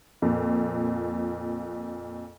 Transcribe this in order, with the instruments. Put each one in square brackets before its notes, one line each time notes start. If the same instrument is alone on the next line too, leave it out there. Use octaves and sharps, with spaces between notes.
[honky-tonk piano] F2 A#2